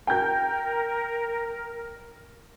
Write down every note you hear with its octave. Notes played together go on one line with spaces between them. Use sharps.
A#4 G5 G6